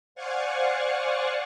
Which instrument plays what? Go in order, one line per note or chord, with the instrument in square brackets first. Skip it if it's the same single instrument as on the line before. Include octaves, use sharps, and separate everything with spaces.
[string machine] C5 D5 F5 F#5 G#5 C#6